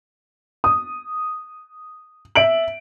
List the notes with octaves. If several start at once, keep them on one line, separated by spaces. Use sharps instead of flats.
D#6
E5 D7 F#7